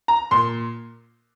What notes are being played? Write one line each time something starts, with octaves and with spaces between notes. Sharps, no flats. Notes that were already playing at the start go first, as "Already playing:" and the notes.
A#5
A#2 C6